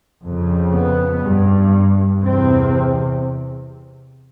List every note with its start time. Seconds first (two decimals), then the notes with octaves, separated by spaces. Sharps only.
0.25 F2 C#3
0.74 B3
1.24 G2
2.23 E2 C3 C4